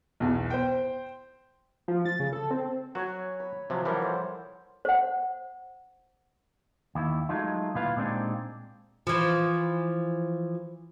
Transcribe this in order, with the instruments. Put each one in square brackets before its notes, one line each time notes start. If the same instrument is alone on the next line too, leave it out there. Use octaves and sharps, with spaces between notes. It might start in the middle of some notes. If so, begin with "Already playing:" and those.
[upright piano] B1 E2
C5 G5
[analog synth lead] F3
A6
C#3
A4
C4
[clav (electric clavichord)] F#3 F#4 [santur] C#5 G#5
[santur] B5
[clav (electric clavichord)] C3 F3 F#3
[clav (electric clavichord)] E3 F3 G3 [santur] A#4 C#5 F#5
[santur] A4 C5
[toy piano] C5 F#5
[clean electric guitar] D#2 E4 E5
F#3 G#3 A3 D#4 F4
D2 A#2 E4 F4 B4 F5
A#2 G#3 C4 D4 D#4 G4
[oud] E3 F3